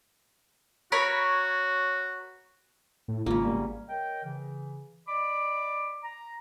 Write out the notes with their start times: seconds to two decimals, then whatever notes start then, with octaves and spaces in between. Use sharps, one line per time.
0.92 F#4 A#4 C#5 B5
3.08 A2
3.26 G#1 C#3 A#3 F4
3.45 G3 B3
3.88 A#4 C#5 D#5 G5
4.23 C#3 E3
5.07 D5 D#5 B5 D6
6.03 A#5